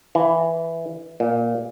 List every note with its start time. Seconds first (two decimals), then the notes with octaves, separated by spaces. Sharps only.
0.15 E3
1.20 A#2